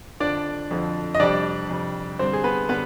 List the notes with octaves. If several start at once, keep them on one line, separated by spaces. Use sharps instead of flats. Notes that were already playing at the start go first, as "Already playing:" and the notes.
F2 D3 F3 D4 D5
F2 D3 F3
D#5
F2 C3 G3 D4 D5
F2 C3 G3
G2 D3 G3 C4 C5
G#4
B3 B4
D3 G3 B3 B4